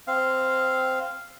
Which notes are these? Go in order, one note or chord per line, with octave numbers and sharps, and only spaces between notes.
C4 F5